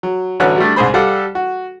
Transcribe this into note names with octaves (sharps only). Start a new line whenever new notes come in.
F#3
A1 D3 F#3 B4 C#5 F#6
G3 A3 D4
C2 G#2 G#4 C5 B5
G3 G4 A4 D5 F5 F#5
F#4